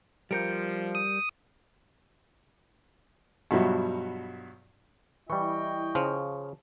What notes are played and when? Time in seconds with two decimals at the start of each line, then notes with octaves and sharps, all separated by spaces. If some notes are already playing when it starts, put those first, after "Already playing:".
0.31 F3 G3 A#4 G6 C#7 D7
0.95 D#6
3.51 G2 B2 F3 F#3 E5
5.30 E3 G3 E4 D#5 G5 C#6
5.95 C#3 F3